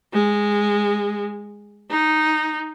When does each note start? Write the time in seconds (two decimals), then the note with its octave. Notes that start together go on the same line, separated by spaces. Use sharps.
0.13 G#3
1.90 D#4